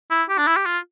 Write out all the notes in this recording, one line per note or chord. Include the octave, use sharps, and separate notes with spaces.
E4
G4
D4
E4
G4
F4